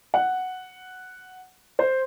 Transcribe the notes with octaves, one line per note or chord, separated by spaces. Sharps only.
F#5
C5